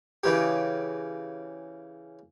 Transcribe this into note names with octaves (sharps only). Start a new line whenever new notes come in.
C#3 E3 G4